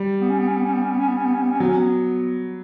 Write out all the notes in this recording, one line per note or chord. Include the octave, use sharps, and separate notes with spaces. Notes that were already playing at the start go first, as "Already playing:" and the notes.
Already playing: G3
B3
C#4
B3
C#4
B3
C#4
B3
C#4
B3
C#4
B3
C#4
B3
C#4
B3
C#4
F#3 B3
C#4
B3